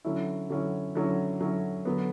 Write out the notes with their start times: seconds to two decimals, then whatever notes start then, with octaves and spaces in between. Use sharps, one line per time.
0.05 D3 F#3 C#4 E4
0.50 D3 F#3 C#4 E4
0.95 D3 F#3 C#4 E4
1.40 D3 F#3 C#4 E4
1.85 D3 F#3 B3